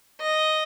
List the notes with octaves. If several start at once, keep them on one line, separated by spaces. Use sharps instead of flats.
D#5